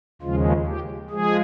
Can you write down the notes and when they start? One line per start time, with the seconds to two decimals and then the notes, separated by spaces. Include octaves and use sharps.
0.22 D#2 C#3 F3 G#3 F4
0.66 G4
1.11 F3 G#3 G#4